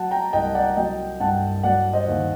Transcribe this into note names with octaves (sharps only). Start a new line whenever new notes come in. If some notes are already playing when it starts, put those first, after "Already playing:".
Already playing: F#3 F#5 A5
G5 A#5
C2 D#5 G5
D5 F#5
F#3 D#5 G5
G2 F#5 A5
F#3 D5 F#5
C5 D#5
D#2